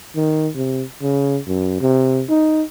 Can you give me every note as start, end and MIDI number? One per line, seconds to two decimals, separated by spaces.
0.16 0.49 51
0.55 0.84 48
1.02 1.39 49
1.47 1.78 42
1.81 2.24 48
2.29 2.62 63